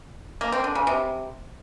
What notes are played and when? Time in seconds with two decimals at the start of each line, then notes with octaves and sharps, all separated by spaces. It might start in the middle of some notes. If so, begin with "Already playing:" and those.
0.41 A#3
0.52 C4
0.64 D3
0.75 C#3
0.87 C3